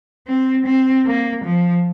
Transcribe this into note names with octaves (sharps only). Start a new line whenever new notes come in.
C4
C4
A#3
F3